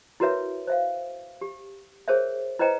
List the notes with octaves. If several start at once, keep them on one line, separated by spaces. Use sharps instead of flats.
E4 F#4 A#4 B4 C#5 E5
C5 E5 F5
G4
G#4 A#4 C5 C#5 E5
E4 B4 C5 D#5 G5 A#5